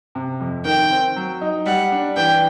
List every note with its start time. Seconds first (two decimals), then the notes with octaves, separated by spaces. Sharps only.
0.15 C3
0.40 F2
0.65 D#3 G5
0.91 C4
1.16 F#3
1.41 D#4
1.66 G3 F#5
1.92 D4
2.16 E3 G5